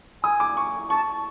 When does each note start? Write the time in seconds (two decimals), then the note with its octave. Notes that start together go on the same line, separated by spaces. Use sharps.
0.24 G#5 D#6
0.40 D6
0.57 C#6
0.90 A5 C#6